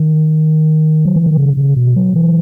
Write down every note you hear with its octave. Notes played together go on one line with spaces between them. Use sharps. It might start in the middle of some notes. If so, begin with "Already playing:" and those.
Already playing: D#3
F#3
E3
D#3
C#3
C#3
B2
F#3
E3